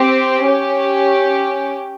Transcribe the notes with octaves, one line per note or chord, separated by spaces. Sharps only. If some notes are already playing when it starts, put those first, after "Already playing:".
Already playing: C4 G4
C#4 G4